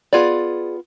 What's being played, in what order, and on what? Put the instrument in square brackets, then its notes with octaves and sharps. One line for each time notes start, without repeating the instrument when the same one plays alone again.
[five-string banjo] B3 F4 G#4 D5